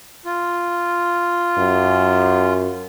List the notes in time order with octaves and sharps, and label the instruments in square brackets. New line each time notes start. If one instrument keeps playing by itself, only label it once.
[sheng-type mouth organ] F4
[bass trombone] F#2